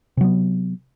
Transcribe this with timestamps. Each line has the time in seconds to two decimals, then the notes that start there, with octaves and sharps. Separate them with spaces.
0.17 C3
0.21 F#3
0.24 B3